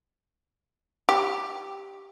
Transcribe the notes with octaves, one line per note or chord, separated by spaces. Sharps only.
G4